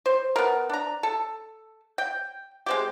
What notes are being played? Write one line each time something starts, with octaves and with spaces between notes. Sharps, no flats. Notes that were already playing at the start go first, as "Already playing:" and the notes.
C5
B3 A#4
D4 A#5
A4
G5
G#3 C4 G4